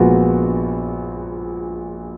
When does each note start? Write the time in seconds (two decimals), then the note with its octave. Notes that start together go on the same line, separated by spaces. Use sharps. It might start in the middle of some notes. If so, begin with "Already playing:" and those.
Already playing: A#1 A#2 G#3 B3 F4 F#4 B4